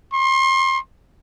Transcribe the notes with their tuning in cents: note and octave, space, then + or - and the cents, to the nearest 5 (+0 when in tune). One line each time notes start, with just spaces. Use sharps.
C6 +35